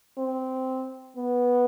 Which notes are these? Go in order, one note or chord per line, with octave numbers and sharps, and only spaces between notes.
C4
B3